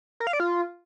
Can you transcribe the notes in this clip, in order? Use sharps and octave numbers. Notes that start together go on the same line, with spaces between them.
A#4
F5
D5
F4